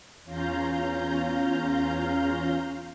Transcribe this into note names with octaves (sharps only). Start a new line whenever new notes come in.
E2 C#4 F4 F5 A#5 G6